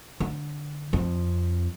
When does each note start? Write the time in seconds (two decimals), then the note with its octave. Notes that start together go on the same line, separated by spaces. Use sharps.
0.20 D3
0.93 F2